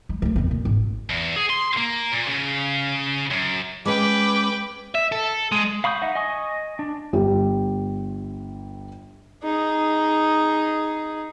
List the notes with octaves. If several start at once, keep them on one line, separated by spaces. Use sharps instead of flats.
G#3
D2 G2
F2 B3
A#2
G#1
E2
G#4
C6
A#3
A#2
C#3
F#2
G#3 C#4 B4 G5 D6
E5
A4
G#3
F5 B5 C#6 D#6 G6
D#4 E5 F#5
D#5 G#5 C#6 D#6
D4
G1 G4
D#4 G#4